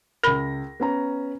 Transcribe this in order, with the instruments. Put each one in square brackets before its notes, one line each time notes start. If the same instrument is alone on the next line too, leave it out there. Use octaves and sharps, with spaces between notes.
[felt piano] C#2 A#6 [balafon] A#4 B5
[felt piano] B3 C#4 A#5